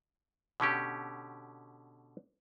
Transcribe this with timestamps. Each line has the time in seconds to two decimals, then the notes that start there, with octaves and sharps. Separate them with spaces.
0.60 B2 D3 C#4 G4